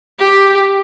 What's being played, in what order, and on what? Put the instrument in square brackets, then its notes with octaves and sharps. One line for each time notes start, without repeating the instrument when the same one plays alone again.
[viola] G4